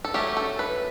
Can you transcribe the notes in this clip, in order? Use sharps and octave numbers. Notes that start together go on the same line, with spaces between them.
A4
F#3 A3 C#4 G4
A4
B4